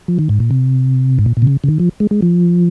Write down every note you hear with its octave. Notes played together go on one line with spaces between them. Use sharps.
F3
D#3
G#2
A#2
C3
G#2
A#2
A#2
C3
C#3
C#3
D#3
F3
G#3
G#3
F3